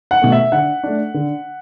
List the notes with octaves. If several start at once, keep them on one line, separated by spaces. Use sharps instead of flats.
F#5
B2 A3
E5
D3 F#5
A3 D4
D3